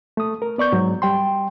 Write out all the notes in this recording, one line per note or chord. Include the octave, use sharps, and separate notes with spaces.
A3 D#6
A#4
B3 D5 C#6 G6
G#2 F#3
G3 G5 C6